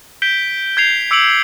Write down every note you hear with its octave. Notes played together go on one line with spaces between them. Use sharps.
G6 B6 D7 G7
G6 G#6 C7 F7
D6 E6 C#7 D7 F7 F#7